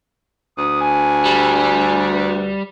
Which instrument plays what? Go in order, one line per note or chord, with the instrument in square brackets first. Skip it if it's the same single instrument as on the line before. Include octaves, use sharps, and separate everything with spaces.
[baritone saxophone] D2 [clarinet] D#6
[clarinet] G#5
[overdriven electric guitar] G3
[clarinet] B4